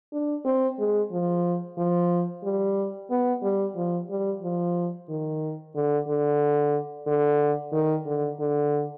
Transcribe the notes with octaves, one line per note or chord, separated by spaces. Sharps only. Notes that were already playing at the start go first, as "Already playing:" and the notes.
D4
C4
G#3
F3
F3
G3
B3
G3
F3
G3
F3
D#3
D3
D3
D3
D#3
D3
D3